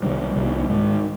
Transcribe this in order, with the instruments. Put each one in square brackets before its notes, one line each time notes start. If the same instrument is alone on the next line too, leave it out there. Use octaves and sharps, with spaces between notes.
[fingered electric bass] C2 C3 D#3 G3
C2 C3 D#3 G3
G#2 D#3 G#3